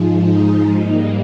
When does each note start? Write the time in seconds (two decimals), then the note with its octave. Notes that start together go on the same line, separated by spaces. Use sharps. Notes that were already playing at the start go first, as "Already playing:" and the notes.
Already playing: G#2 F3 G#3
0.13 D#4
0.76 G#2 G3 A#3 D#4